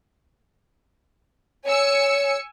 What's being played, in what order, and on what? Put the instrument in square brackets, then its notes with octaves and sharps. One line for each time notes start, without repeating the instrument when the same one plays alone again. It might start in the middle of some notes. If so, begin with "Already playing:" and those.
[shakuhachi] C#5 [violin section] G#5 E6 C#7